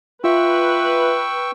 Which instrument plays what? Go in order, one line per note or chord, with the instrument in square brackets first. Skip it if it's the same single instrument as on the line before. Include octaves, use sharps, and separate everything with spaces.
[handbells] F4 E5 [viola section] B4 [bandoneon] G5 C#6 E6